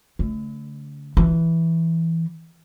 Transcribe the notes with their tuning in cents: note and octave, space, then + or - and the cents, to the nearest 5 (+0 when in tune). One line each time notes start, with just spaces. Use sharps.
D3 -40 A3 +0
E3 +0 E4 +0